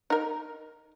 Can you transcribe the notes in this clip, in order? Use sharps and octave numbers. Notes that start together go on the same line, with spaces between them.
D#4 A#4